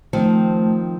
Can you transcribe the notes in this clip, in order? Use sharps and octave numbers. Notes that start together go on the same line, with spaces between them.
D#3 F3 A3 C4